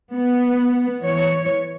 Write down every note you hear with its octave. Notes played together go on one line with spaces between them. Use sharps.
B3
E3 C#5